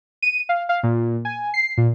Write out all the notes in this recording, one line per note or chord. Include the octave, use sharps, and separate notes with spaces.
D#7
F5
F5
A#2
G#5
C7
A#2